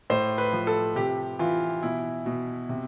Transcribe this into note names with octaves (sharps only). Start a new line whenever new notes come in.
A2 C5
B4
F3
A4
C3 G4
E3 F4
B2 E4
B2
C3